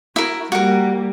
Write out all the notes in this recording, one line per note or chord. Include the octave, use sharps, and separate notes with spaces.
E4 F#4 A#4
G3 A#3 F#4 A#4